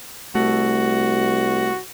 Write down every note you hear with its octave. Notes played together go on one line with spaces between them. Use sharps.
C2 A3 F#4